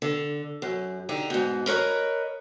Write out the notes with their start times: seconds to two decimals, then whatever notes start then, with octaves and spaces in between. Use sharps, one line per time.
0.02 D3
0.62 F#2
1.09 D3 D#4 G4
1.30 G#2 B2
1.66 A#4 B4 C#5 D#5